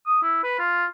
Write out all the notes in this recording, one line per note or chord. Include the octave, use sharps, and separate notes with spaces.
D#6
E4
B4
F4